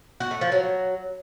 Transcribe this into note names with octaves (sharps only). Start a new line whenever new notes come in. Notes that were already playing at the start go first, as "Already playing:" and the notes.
F#4
A3
F3
F#3